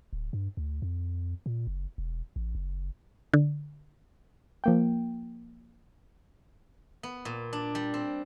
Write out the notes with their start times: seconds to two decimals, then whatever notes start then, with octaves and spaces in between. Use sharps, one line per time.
0.13 D1
0.33 G2
0.57 D2
0.82 F2
1.46 A#2
1.67 F#1
1.98 E1
2.36 A1
2.55 F#1
3.34 D3
4.64 F3 A#3 G5
7.03 B3
7.25 A#2
7.53 D4
7.75 G3
7.94 C4